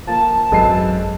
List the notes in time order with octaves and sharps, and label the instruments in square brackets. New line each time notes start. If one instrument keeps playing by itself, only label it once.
[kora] F3 A#3 [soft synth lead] A5
[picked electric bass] G#1 [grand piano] F#2 C7 [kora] G#3 A4 B4